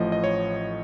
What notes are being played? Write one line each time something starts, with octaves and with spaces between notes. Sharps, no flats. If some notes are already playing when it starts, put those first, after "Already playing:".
Already playing: A1 A2 F3 D#5
D#5
C#5